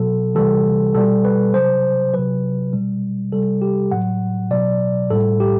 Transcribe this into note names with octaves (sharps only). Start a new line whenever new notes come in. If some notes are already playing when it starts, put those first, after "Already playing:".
Already playing: B2 F#3 A4
C3 E3 G3 A4
B2 G3 A4
B4
C3 F#3 C5
C3 F#3 B4
B2 G3
C3 G3 A4
G4
A2 F#3 F#5
B2 F#3 D5
A2 G3 A4
G4